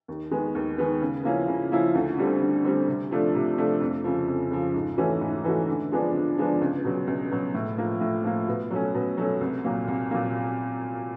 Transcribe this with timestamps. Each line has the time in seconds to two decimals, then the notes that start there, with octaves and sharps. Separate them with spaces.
0.08 D#2
0.31 D#3 G#3 B3
0.55 D#2
0.78 D#3 G#3 B3
1.01 C#3
1.24 F3 A#3 C#4 E4
1.48 C#3
1.72 F3 A#3 C#4 E4
1.95 D2
2.18 D3 G3 C4
2.41 D2
2.65 D3 G3 C4
2.87 C3
3.11 F3 A3 D4
3.35 C3
3.58 F3 A3 D4
3.81 F2
4.04 C#3 F3
4.28 F2
4.51 C#3 F3
4.74 G#2
4.98 E3 A3 C#4 F#4
5.21 G#2
5.45 E3 A3 C#4 F#4
5.68 D3
5.91 F3 G#3 B3 D4
6.15 D3
6.38 F3 G#3 B3 D4
6.61 C#2
6.85 B2 F#3
7.07 C#2
7.31 B2 F#3
7.54 A2
7.78 F3 A#3
8.01 A2
8.24 F3 A#3
8.48 B2
8.71 F#3 A3 C#4
8.95 B2
9.17 F#3 A3 C#4
9.41 C2
9.64 A#2 F#3 A#3
9.88 C2
10.11 A#2 F#3 A#3